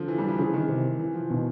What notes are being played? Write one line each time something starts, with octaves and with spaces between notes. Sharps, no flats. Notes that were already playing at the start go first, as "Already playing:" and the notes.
Already playing: D3 F3
E3
G3
F3
C#3 E3
D#3
C3
E3
F3
B2 D#3